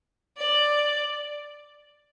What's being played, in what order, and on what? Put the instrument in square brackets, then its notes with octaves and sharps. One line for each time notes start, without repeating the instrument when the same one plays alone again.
[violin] D5